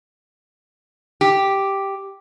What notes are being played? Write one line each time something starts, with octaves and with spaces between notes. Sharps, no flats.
G4